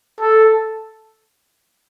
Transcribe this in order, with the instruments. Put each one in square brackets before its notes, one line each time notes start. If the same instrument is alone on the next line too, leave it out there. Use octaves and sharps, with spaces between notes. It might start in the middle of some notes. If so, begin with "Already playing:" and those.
[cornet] A4